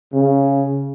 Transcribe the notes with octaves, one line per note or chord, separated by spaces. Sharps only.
C#3